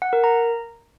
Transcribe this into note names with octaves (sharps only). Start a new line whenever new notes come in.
F#5
A#4
A#5